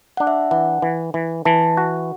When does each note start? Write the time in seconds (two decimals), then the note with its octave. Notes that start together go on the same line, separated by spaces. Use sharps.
0.17 D4 F#5
0.27 E5
0.51 E3 F#5
0.82 E3
1.14 E3
1.45 E3 A5
1.77 F#4